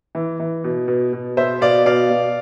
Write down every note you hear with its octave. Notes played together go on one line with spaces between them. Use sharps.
E3
E3
B2
B2
B2
B2 C5 E5
B2 D5 F5
B2 D5 F5
B2